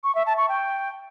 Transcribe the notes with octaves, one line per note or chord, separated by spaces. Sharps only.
C#6
E5
A5
C#6
G5